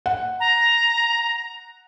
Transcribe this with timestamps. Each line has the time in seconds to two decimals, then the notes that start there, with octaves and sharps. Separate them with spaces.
0.06 F#5
0.40 A#5